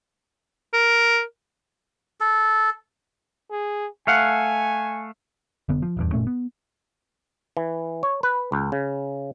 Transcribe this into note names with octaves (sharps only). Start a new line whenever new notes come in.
A#4
A4
G#4
A3 F5 F#5 G#5
F1 D3 B3
F3
D#1 E2 G2
F#1 A#2 A3 C#4
B3
E3
C#5
B4
C#2
C#3